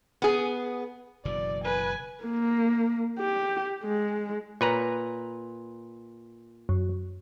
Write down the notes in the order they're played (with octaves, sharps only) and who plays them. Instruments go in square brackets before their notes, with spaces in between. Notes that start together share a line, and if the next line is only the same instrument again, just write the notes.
[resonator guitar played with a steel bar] B3 G#4
[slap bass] F#1 B2 E3 [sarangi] D5
[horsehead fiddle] B4 [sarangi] G#5
[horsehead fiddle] A#3
G4
G#3
[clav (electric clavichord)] A#2 B4 A#5 [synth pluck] C#5
[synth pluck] F#2